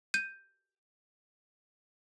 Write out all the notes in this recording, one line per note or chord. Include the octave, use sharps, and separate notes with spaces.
G6 D#7